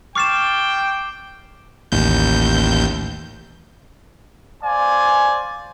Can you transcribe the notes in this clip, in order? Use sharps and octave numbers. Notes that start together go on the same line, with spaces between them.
G5 C#6 D6 F6 A6 C7 E7
A1 D#2 G6
C5 D5 F5 G#5